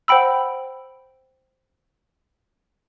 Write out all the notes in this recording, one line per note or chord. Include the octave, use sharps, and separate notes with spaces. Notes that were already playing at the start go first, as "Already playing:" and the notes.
C5 F#5 G5 B5 E6